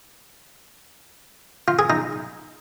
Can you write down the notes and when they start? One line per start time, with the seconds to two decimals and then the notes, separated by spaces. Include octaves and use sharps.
1.68 F4
1.79 G#4
1.90 D#4